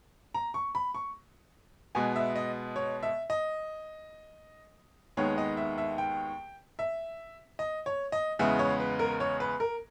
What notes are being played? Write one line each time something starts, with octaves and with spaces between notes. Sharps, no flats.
A#5
C#6
B5
C#6
B2 G#3 B3 G#5
E5
D#5
C#5
E5
D#5
D#2 D#3 G#3 B3 C#5
D#5
E5
E5
G5
E5
D#5
C#5
D#5
E2 C#3 G#3 B3 E5
C#5
B4
A#4
C#5
B4
A#4